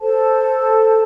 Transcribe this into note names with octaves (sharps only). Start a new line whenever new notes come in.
A4 C5 A5